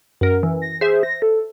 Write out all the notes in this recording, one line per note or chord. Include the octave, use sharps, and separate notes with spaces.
F#2 A#4
E3
A#6
G#4 C5 E5
A#6
A4